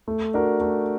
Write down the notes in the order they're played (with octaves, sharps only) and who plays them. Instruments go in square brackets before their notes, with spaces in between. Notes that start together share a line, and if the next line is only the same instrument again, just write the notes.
[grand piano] A3
D4 F#4 A#4
A3